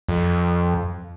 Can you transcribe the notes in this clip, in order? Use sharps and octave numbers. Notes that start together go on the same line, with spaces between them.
F2